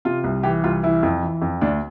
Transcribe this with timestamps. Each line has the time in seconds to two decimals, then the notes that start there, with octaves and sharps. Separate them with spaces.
0.05 C3 F4
0.24 C2
0.43 E3 G4
0.64 C2 F4
0.83 E3 E4
1.03 F2
1.22 E3
1.42 F2
1.61 D2 D4